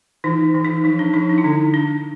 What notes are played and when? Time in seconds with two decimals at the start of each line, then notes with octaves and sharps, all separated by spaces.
0.24 E3 D#4
0.55 E3
0.65 D#4
0.84 F3 D#4
0.99 D4
1.14 F3 D#4
1.29 D4
1.38 E4
1.44 D3 D#4
1.74 D4